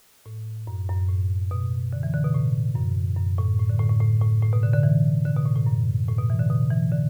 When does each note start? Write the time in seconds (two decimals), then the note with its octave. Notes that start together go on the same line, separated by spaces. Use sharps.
0.26 A2
0.67 F#2
0.89 F#2
1.09 A2
1.51 B2
1.93 D3
2.03 E3
2.14 D3
2.24 B2
2.34 A2
2.75 F#2
3.17 F#2
3.38 A2
3.59 A2
3.69 D3
3.79 A2
3.90 A2
4.00 A2
4.21 A2
4.42 A2
4.53 B2
4.63 D3
4.73 D3
4.83 E3
5.25 D3
5.36 B2
5.46 A2
5.56 A2
5.66 F#2
6.08 A2
6.19 B2
6.30 E3
6.39 D3
6.50 B2
6.70 E3
6.92 D3